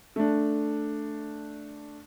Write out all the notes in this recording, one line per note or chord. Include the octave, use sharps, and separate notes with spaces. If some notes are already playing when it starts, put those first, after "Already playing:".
A3 D4